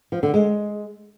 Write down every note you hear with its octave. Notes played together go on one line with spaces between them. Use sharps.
F3
D3
G#3